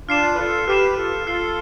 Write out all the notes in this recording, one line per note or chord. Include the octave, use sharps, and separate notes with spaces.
D4 F4 F6 C7 E7
B4
F4 A4
G4 B4 F6 C7 E7
F4 A4
F4 A4 F6 C7 G7